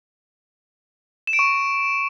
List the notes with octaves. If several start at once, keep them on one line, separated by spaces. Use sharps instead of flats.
E7
D7
C#6